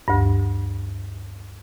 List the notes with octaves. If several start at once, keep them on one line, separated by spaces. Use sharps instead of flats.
D2 G2